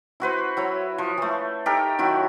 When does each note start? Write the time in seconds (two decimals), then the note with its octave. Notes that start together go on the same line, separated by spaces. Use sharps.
0.20 E4 F#4 B4 C5
0.57 F#3 E4 C#5
0.98 F3
1.18 E3 A3
1.66 D#4 G4 A4 A#4
1.99 D#3 F#3 E4 F#4